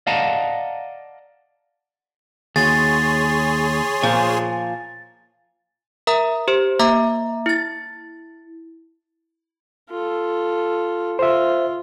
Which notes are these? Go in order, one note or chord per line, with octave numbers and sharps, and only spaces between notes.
D5 D#5 F5 F#5 A5 A#5
D#2 F#4 G#4 C#5 C6 A6
A#2 F3 F4 G#5
A#4 E5 A#5 D#6
G4 C5
A#3 E5 A#5 D6
E4 A6
F4 A4
F4 C5 E5